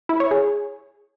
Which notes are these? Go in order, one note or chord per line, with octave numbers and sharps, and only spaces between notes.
E4
C#5
G#4